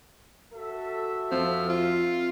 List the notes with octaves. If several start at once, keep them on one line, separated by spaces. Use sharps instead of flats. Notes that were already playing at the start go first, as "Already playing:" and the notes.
F#4 A4 E5
F2 F3
F4